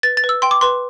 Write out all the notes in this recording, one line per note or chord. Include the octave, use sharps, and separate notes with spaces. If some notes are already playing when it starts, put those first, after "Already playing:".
B4 A6
A6
B4
E6
G5 C6
D6
B4 C6